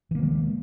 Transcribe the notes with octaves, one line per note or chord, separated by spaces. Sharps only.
D#3 E3 G#3 A#3